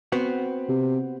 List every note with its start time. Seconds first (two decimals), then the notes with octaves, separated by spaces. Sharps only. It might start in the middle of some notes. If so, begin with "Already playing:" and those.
0.12 B3 C4 F#4
0.69 C3